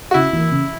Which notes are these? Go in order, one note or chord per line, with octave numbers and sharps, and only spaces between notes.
F#4
C#3 E4
E3 A#3
C#3